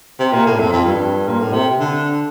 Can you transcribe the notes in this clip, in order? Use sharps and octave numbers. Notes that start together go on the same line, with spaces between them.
C3
A#2
A2
F2
F2
G2
A#2
A2
C3
D3